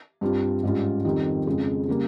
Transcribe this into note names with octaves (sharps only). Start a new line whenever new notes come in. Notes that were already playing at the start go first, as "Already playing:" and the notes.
G2 G3 C4 F4
G#2 G3 C#4 F4
F2 D#3 G3 C4
F2 C#3 G#3
C#3 G3 A#3